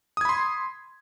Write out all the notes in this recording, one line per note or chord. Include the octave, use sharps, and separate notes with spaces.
B5 C6 D#6 G#6